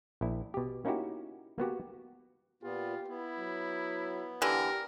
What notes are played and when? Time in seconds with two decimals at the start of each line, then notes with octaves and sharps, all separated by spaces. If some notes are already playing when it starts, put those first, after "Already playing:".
0.21 A#1 E4
0.54 B2 G4
0.85 A#3 C#4 D#4 E4 F#4 G4
1.58 A#3 B3 F#4 G4
2.63 A#2 B3 F4 G4
3.08 B3 E4
3.38 F#3
4.42 D3 E3 G4 A#4